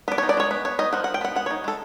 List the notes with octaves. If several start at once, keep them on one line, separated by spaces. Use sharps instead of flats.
B3 D5
C#5
D#4
D5
G#3 C#5
B3
B3 C#5
D#4 D#5
F3 F#5
F#5
F3
G5
B3 F#5
G#3 F#5
C#5
D#4
G#3 A4